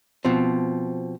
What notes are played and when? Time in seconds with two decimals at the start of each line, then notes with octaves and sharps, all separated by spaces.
0.25 B2 F3 C4